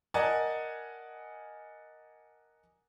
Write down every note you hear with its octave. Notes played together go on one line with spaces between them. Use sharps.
A#4 D5 D#5 F#5 G#5 A5